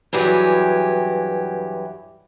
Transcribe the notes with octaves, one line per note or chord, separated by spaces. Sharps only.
G2 E3 F#3 G4 G#4